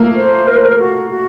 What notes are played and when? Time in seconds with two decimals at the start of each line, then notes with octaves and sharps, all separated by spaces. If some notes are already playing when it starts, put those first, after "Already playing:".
Already playing: A3 A#3
0.16 C5
0.47 A#4
0.57 C5
0.65 A#4
0.79 F#4
1.10 F#4